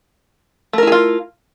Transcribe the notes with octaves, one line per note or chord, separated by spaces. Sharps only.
A3 E4 F4 G#4 A#4